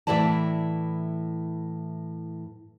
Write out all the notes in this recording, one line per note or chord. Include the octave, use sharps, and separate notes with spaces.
A2 E3 G#3 E4 D5 A5